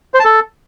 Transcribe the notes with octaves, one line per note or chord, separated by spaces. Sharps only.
C5
A5
A4